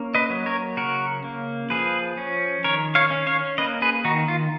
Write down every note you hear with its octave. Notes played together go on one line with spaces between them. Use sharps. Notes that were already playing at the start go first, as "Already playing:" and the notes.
Already playing: A#3 C#4
B4 D#5
F#3
A#4 C#5
C#3 F#4 A#4
A#3
F3 G#4 B4
C#4
D#3 A#4 C#5
C#5 F5
C#4
C#5 F5
A#3 B4 D#5
G#4 B4
D#3 D#4 F#4
F4